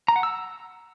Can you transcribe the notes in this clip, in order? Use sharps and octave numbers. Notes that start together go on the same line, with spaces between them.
A#5
F#5
E6